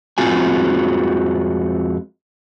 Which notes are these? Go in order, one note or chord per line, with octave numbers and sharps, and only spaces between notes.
F2 G#3 C4 F4 F#4 G#5